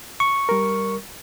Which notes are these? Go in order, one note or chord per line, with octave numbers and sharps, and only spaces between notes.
C#6
G3 A#4